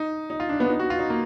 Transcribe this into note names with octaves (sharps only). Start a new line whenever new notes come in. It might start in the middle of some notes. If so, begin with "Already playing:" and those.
Already playing: D#4
D#4
F4
D4
B3
D#4
F#4
F4
D#4
A#3